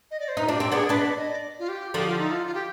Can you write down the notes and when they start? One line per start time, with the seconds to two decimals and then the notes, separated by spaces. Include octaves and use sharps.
0.11 D#5
0.20 D5
0.28 C5
0.37 D#4 B4
0.47 D4 F4
0.55 G4
0.60 C4
0.72 B3 D4 G#4
0.89 B3 D4 B4
0.99 D#5
1.03 D5
1.16 D#5
1.28 D5
1.59 F4
1.69 G4
1.94 D3 F3 G4
2.06 F4
2.19 D#4
2.31 F4
2.47 F4
2.55 G4